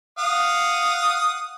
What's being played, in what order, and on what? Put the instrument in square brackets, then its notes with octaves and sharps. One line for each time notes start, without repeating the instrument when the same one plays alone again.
[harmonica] F5 F#5 D#6